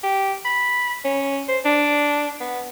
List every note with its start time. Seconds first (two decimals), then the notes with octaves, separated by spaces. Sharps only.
0.03 G4
0.45 B5
1.05 C#4
1.48 C5
1.65 D4
2.40 B3